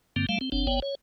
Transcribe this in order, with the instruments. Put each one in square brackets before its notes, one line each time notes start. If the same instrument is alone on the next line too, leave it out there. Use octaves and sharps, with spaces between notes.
[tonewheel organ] G2 D3 A#3 C4
G3 A3 F5
C4
F#1 C4 D4
G1 B3 C#5 G5
C#5